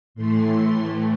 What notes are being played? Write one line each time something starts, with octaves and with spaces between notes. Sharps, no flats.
A2 E3 A3 C6